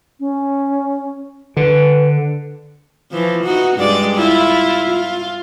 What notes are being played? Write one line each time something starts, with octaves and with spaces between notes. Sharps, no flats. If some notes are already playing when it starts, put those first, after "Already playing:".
C#4
D3 B4
E3 F3
D#4 F#4
G2 G#3 D5
E4 F4
F4